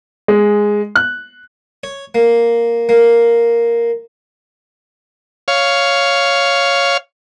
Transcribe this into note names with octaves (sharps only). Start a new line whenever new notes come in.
G#3
F#6
C#5
A#3
A#3
C#5 F5